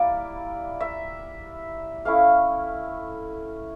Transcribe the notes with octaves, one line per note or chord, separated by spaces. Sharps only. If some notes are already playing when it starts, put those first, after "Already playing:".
Already playing: G3 A#3 E4 D5
E5
A3 C#4 E4 F5